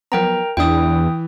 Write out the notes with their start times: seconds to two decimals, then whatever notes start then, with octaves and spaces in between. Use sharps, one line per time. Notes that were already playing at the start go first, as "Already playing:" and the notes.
0.12 F3 F#3 B3 A#4 G5 A#5
0.57 E2 E3 D4 E4 G5 D#6